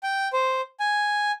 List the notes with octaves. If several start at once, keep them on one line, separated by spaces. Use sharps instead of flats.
G5
C5
G#5